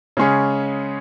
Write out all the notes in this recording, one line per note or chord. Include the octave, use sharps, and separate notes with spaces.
C#3 G#3 C#4 G#4